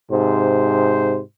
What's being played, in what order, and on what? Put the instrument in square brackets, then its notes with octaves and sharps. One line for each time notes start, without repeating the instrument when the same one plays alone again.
[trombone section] G#2 C3 C5